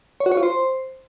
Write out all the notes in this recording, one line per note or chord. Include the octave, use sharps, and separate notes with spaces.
C#5
F#4
C#5
F4
C5